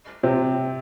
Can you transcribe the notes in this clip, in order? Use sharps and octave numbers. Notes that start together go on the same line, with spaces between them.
C3 C4